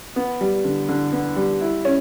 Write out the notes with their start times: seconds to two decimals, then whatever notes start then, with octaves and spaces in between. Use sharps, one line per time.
0.16 B3
0.41 G3
0.64 D3
0.89 D3
1.12 B3
1.37 G3
1.61 E4
1.85 C#4